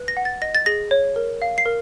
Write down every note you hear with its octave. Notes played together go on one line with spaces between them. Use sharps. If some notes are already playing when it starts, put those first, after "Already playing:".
Already playing: B4
A#6
F#5
A6
D#5 A#6
A6
G#4 A#6
C#5
A#4
F5
C7
A#4